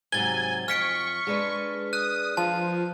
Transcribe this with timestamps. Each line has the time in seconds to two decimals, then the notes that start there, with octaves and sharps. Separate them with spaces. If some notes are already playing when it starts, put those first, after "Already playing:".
0.12 G#2 C3 F#3 G#5 A6 G7
0.68 F2 C#6 F6 B6 D7
1.27 G#3 D4 B4
1.93 D#6 F#6
2.37 F3 A5